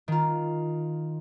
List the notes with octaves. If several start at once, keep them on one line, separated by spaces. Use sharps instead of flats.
D#3 F4